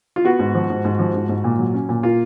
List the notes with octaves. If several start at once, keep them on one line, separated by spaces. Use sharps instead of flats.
F4
B3 F#4
G#2
F3
G#2
G#2
F3
G#2
G#2
A#2
F#3
C#4
A#2
A#3 F4